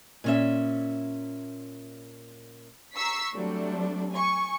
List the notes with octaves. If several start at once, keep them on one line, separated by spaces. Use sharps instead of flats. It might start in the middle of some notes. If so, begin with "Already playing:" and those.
A#2 C#4 E5
A#5 C#6 E6 B6 C7
F#3 G3 A3 C4 D4
G#5 C#6